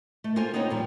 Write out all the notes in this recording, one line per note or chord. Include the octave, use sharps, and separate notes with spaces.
A3
A#3 F4 A4 C5 G#5
B3 C4 D#4 B4 C#5
F2 A#2 D#3 F3 G3